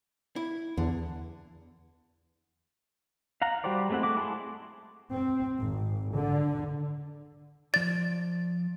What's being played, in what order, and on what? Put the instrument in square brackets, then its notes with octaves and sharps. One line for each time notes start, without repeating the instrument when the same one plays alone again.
[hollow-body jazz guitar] E4
[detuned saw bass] E2 [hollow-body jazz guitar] D3
[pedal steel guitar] F5 F#5 A#5
G3 F#4 G4 C5 D5
G#3 A3 C4 E4 F#5
A3 F#4 D6
E4 G#4 A5 B5 C6
[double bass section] C4
G#1
D3
[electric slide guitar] F3 D5 [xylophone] A6